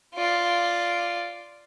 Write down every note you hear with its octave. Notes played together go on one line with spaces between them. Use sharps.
F4 D5